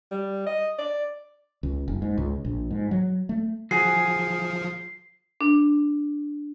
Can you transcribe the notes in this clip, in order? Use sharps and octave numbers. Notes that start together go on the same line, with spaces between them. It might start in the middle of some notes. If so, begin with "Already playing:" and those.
G3
D#5
D5
C#2
F#1
G#2
C#2
A#1
G#2
F#3
A3
F3 F#4 G#4 C7
D4